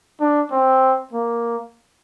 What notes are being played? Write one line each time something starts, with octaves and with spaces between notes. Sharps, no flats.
D4
C4
A#3